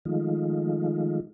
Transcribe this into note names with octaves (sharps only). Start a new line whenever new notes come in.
D#3 F3 G#3 A3 D#4 F4